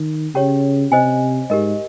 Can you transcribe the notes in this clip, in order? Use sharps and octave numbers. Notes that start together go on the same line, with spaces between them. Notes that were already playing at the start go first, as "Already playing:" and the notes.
Already playing: D#3
C#3 C#4 G4 C#5
C3 C5 D#5 G#5
G#2 G4 A#4 D#5